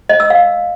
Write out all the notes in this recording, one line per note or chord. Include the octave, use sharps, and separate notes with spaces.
D#5
E6
F5